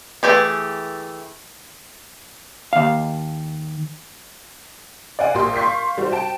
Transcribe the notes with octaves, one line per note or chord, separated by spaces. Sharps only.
E3 A3 G4 G#4
D#2 F5
D5 F5 F#5 G#5
A#1 A#2 G4 C6
F5 C6 C#6 G6 B6 C7
G3 F#4 C5
F#4 G5 A5